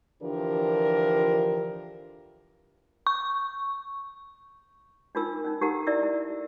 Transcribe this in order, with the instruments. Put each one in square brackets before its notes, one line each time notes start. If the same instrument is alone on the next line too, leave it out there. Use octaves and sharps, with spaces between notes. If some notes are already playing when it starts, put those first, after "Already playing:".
[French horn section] D3 E3 F3 D4 G4 A#4
[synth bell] C#6
[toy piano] D4 D#4 F4 A#4 E6
C#4 D#4
D#4 G4 A4 A#4 F#5 A#5
E4 D5 E5 E6
E4